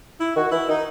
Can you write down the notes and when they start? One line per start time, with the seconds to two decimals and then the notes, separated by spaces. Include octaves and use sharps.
0.20 E4
0.36 D#3 F#4
0.52 E3 E4
0.68 D#3 D#4